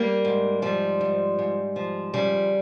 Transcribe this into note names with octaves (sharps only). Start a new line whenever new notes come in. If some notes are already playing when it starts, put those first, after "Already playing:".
Already playing: G3 A#3
G#2
F3 G3
G#2
G#2
F3
C#3 G3